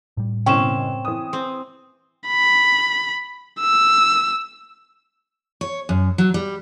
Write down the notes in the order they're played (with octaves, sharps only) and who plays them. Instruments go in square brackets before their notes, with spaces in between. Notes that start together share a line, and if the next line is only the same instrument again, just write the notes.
[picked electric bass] A2 G3
[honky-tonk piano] F#1 B2 E3 [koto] C4 C#4 [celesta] G5 E7
[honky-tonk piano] E3 D#6
[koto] C4
[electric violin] B5
E6
[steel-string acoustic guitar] C#5
F#2
F#3
G3